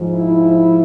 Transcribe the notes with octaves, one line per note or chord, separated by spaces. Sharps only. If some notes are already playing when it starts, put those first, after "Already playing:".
Already playing: G#2 F3
E4